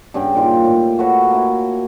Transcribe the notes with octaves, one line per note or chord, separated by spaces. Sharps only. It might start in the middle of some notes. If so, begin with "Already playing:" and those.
G2 C#3 G#4 G5
A#2 D#3 F4 G4
A2
F#4 A4 B4 C#5
A#3 E4